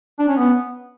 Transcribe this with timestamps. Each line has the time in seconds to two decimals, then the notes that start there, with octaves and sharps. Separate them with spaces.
0.19 D4
0.28 C#4
0.37 B3